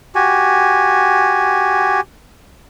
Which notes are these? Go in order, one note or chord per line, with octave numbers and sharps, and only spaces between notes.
F#4 G4 G#5